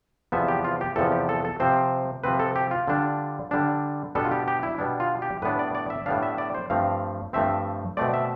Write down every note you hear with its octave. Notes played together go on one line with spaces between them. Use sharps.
E2 C3 F3 B3 E5
G4
F4
G4
E2 C3 F3 B3 A4
G4
A4
A4
C3 F3 C4 C5
C3 F3 C4 B4
A4
G4
F4
D3 G3 D4
D3 G3 D4
B2 G3 B3 D4 A4
F4
G4
G4
E4
B2 G3 B3 D4
F4
G4
A2 G3 B3 D4 B4
D5
D5
E5
A2 G3 B3 D4 F5
E5
D5
C5
G2 F3 A3 C4 F5
G2 F3 A3 C4 E5
B2 A3 C4 D5
E5